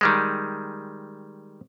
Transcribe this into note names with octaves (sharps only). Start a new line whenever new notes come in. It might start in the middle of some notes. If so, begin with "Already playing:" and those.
D#3 G3 G#3